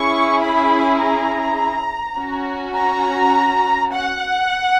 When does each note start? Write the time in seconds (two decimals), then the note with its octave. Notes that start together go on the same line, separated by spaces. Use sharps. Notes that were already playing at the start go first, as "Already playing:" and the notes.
Already playing: C#4 E4 G#4 C#6
0.41 B5
1.00 A#5
2.18 C#4 F#4
2.76 A#5
3.93 F#5